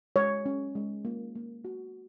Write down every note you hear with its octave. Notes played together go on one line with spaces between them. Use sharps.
G#3 C#5
C#4
G#3
A#3
A#3
F#4